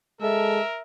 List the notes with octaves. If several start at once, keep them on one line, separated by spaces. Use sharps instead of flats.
G#3 A4 A#4 E5